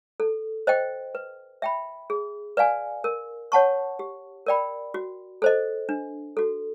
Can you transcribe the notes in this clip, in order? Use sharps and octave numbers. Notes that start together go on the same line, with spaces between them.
A4
C5 D#5 G5
B4
E5 G5 B5
G#4
B4 D5 F5 G#5
A#4
C#5 F#5 A5 C#6
G4
A#4 D5 G5 B5
F#4
A4 C5 D#5
D4
F#4 A4